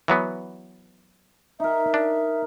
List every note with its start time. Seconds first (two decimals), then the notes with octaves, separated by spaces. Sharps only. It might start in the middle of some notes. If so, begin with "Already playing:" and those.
0.08 E3 F#3 B3
1.60 D#4 A#4 E5
1.94 D4